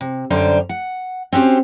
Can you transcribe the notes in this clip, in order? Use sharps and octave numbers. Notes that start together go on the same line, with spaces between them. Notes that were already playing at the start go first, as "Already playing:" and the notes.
C3
F#2 D3 G3 C5 D5 A#5
F#5
C4 C#4 F#4 G4 C5